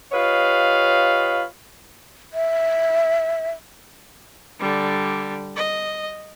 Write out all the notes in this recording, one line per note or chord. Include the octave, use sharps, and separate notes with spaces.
F4 G4 B4 C#5 D#5 F5
E5
D3 G3
D#5